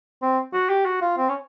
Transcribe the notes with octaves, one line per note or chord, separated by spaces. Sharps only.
C4
F#4
G4
F#4
F4
C4
C#4